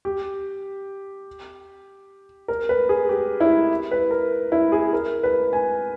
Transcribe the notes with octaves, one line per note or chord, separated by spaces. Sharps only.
G4
A#4
B4
G#4
G4
E4
B4
A#4
E4
G#4
A#4
B4
G#5